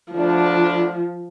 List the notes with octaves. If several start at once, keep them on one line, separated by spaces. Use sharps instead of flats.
D2 D3 F3 A3 D4